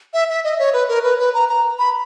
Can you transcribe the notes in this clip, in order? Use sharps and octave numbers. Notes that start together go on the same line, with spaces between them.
E5
E5
D#5
C#5
B4
A#4
B4
B4
A#5
A#5
B5